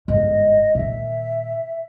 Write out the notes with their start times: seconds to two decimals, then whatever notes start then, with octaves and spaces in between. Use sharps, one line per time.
0.08 G1 G#2 D#5
0.75 A#2 D#3 E5